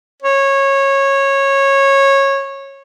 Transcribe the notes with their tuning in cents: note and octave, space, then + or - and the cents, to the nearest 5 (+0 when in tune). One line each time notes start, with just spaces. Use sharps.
C#5 -15